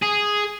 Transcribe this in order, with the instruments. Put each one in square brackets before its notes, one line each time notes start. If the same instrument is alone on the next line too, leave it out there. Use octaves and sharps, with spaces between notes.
[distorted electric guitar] G#4